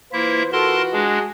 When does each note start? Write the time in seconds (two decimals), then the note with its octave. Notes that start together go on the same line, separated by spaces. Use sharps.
0.13 E3 A#3 E4 F4 B4 C5 E5
0.53 F#4 A4 A#4 A5 C6
0.93 G#3 D4 G#4